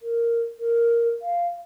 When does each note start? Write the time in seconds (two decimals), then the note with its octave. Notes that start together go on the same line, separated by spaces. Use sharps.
0.02 A#4
0.60 A#4
1.22 F5